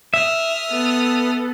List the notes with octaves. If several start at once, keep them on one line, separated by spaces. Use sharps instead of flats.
E5 D#6 F6
B3 A4